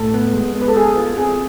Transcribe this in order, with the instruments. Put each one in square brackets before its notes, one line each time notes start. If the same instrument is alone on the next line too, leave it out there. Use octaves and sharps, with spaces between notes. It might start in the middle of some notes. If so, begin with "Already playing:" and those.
Already playing: [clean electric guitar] A2 [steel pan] A4
[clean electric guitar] B3
G#3
B3
[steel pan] B4
A4
[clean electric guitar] B3 [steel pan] G#4
[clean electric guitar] F4
[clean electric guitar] C4 [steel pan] G#4